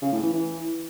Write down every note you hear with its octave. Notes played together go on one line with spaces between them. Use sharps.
C#3
A2
E3
E3